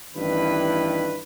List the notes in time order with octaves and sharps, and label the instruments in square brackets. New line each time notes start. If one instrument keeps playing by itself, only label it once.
[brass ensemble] A1 G2 D#3 E4 B4